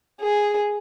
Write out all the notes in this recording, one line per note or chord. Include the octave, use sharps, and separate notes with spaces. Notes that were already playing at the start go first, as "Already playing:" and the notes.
G#4